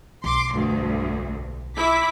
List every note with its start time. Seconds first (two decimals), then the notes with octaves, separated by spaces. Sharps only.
0.24 B1 C6 D6
0.54 D2 G2
1.77 E4 D6 B6